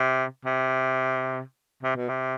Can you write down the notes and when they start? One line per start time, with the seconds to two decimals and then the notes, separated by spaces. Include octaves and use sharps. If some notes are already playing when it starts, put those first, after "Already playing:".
Already playing: C3
0.45 C3
1.83 C3
1.96 B2
2.09 C3